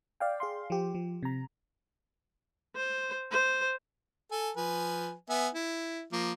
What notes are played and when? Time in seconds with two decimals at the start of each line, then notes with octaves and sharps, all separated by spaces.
0.20 D5 F5 G5
0.40 G#4 F5 C6
0.70 F3 G4
0.94 F3
1.23 C3 A#5
2.76 C5
3.31 C5
4.31 A4 G#5
4.57 F3 B4 G#5
5.29 B3 E5 G#5
5.55 E4
6.12 F3 A#3